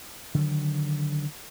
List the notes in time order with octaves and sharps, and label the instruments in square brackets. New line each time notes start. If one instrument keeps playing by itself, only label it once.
[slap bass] D3 D#3 F#3